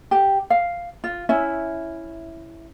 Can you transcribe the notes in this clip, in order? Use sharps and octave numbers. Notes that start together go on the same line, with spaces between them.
G4
F5
F4
C#4 E4 E5